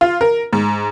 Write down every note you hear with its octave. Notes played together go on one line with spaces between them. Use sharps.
F4
A#4
G#2